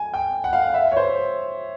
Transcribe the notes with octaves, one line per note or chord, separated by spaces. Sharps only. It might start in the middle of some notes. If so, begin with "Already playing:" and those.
Already playing: G#5
G5
F#5
F5
F#5
E5
C#5
C5